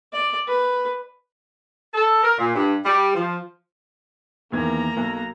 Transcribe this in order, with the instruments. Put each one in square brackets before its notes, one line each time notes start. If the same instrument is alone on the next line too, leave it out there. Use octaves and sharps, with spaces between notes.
[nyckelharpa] D5
B4
[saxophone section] A4
A#4
A#2
G2
G3
F3
[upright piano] E2 D#3 G#6 [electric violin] A#3 A#5
[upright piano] B1